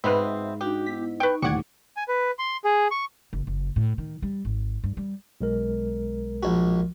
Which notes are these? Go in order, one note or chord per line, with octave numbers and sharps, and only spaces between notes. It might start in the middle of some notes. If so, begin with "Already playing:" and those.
G#2 B2 B3 C4 B4 E5 F5 B5
D4 D#4 F#4 G4
B3 E4 B6
D#4 B4 G5 C#6
D#1 D2 A2 G4 D5 F#5 C#6 G#6
G#5
B4
C6
G#4
C#6
F#1
F#1
A2
D#3
G3
G#1
G2
G3
B1 G#3 A#4
A#1 F#4